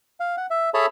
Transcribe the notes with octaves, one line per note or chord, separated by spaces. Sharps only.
F5
F#5
E5
G#4 A4 C#5 E5 A5 B5